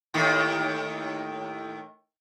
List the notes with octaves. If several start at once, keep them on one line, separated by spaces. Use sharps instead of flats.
D#2 A2 D#3